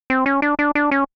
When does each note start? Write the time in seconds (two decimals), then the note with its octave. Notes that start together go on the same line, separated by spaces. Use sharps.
0.10 C4
0.26 C#4
0.42 D4
0.59 D4
0.75 D4
0.91 C#4